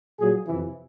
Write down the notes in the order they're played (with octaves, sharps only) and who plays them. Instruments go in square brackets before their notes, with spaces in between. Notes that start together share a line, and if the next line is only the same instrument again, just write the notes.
[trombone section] A#2 F#3 G#4
F2 C3 E3 E4